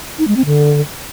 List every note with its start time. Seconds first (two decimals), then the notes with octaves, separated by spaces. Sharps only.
0.19 D#4
0.28 G#3
0.37 C4
0.46 D3